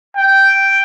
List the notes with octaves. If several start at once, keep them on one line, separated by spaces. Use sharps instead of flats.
G5